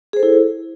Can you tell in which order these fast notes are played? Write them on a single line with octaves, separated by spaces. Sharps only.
G#4 C5 A4 E4